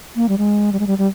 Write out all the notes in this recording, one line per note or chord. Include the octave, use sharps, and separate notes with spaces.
A#3
G3
G#3
G3
G#3
G3
G3